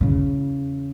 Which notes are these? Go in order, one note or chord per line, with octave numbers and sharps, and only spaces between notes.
E2 C#3